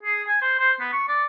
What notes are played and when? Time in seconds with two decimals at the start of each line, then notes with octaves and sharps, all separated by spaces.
0.03 G#4
0.28 G#5
0.42 C5
0.59 C5
0.80 B3
0.93 C#6
1.08 D5